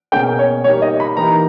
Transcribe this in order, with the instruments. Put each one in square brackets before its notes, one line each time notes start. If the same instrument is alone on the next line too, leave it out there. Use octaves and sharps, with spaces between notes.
[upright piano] B2 A#3 C#4 G#4 [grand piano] G5
[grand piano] C#5
[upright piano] G3 A#3 D#4 G4 [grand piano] C#5
[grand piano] D#5
B5
[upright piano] E3 A#3 D#4 G4 A#4 [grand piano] A#5